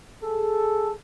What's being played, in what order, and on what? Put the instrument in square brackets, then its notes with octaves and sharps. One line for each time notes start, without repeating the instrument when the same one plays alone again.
[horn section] G#4 A4